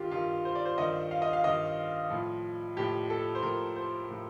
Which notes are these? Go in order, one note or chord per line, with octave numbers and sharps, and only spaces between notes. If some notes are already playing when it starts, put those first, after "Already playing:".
Already playing: G2 D#3 F4 G4
G2 D#3 F4
C5
D5
C5
G2 D#3 D#5
F5
D#5
F5
G2 D#3 D#5
A2 F3
A2 F3 G4
A4
C5
A2 F3 A#4
C5
A2 F3